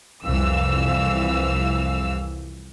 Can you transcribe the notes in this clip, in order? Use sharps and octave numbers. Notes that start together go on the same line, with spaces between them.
C2 F2 E3 F5 E6